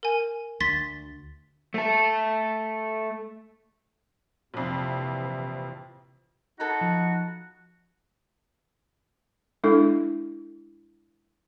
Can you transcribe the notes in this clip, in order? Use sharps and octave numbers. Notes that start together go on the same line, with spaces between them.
A#4 G#5
D2 C6 A6 B6
A3 A4
A#1 F2 C3 E3
D#4 F#4 A4 F#5 B5
F3
G#3 D4 E4 A4